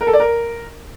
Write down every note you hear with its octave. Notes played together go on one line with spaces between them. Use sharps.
A#4
A4
D5
A#4